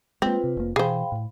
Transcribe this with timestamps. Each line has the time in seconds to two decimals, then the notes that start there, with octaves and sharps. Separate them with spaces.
0.22 G#3 A#3 C4 F4 B4
0.44 C3
0.57 F1 A#3
0.76 B2 E3 G#4 C5 F5 G5 B5
1.12 A2